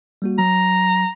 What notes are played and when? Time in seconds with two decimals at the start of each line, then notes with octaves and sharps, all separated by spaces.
0.22 G3 A#3 F#4
0.39 F#3 A#5